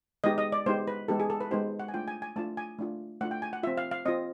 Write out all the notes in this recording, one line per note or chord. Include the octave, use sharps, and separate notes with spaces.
G#3 B3 D#4 G4 D#5
D#5
D5
G#3 B3 D#4 G4 C5
B4
G#3 B3 D#4 G4 A4
G#4
A4
B4
G#3 B3 D#4 G4 C5
F#5
G#5
A3 D4 F4 G5
G#5
G#5
A3 D4 F4 A5
G#5
A3 D4 F4
A3 D4 F4 F#5
G5
G#5
F#5
C4 F4 E5
F5
F5
C4 F4 D#5